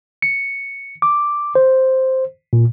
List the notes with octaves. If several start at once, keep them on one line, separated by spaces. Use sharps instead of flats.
C#7
D6
C5
A#2